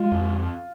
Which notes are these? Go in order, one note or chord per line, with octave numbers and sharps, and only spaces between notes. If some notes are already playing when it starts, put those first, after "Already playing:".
Already playing: G#3 F4
F2